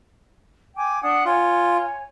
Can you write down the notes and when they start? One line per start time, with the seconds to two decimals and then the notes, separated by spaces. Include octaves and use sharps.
0.76 G5 G#5 D6
1.02 D4 F#5 D#6
1.25 F4 C#5 G#5